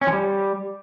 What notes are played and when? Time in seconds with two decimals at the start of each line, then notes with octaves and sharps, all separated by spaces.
0.01 C#4
0.07 F3
0.12 G3